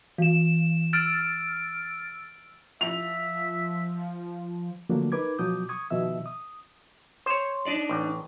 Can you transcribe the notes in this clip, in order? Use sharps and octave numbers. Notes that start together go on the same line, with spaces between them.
E3 E7
E6 F6 A6 D7
F3 E5 F7
D3 F3 F#3 A3 A#3 D4
D#4 A#4 B4 D6 G#6
B2 F3 F#3 D6 D#6 G6
C#6 D#6 G#6
B2 D#3 F3 D#5 E5 E6
D#6
C5 C#5
D4 D#4 D5
A1